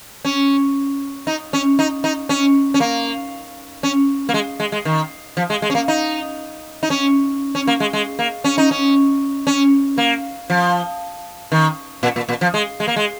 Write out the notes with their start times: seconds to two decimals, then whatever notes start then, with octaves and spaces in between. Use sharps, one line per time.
0.25 C#4
1.27 D#4
1.53 C#4
1.79 D#4
2.04 D#4
2.29 C#4
2.74 C#4
2.80 A#3
3.83 C#4
4.29 A#3
4.34 G#3
4.60 G#3
4.72 G#3
4.85 D#3
5.37 F3
5.50 G#3
5.62 G#3
5.70 C#4
5.75 A#3
5.88 D#4
6.83 D#4
6.90 C#4
7.55 C#4
7.67 A#3
7.80 G#3
7.93 G#3
8.19 A#3
8.44 C#4
8.58 D#4
8.71 C#4
9.47 C#4
9.98 A#3
10.50 F3
11.52 D#3
12.03 A#2
12.16 A#2
12.29 A#2
12.41 F3
12.54 G#3
12.80 G#3
12.88 A#3
12.96 G#3